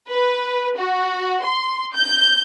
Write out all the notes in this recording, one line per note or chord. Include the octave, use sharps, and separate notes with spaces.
B4
F#4
C6
G6